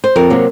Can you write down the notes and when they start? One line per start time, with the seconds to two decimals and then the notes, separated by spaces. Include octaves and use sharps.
0.04 C5
0.16 F2 A#4
0.30 C3 F#3 A#3